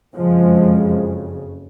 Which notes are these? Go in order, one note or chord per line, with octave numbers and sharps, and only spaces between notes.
F#1 F2 C#3 F3 G#3